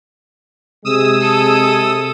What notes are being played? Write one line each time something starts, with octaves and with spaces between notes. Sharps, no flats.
C3 G#3 G#4 D#6 E6
A4